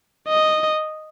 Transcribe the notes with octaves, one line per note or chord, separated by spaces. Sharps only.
D#5